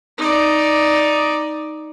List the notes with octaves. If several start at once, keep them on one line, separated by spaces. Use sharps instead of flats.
D#4 D5